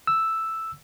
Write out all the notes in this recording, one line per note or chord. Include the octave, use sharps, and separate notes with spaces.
E6